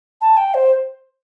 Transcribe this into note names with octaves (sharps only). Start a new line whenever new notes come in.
A5
G5
C5